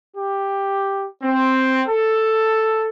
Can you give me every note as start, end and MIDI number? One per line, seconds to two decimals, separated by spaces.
0.15 1.05 67
1.22 1.82 60
1.88 2.88 69